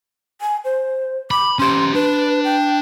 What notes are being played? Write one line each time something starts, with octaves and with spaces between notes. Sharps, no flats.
G#5
C5
B5 D6
C#4 G4 C6
D4 B4
G5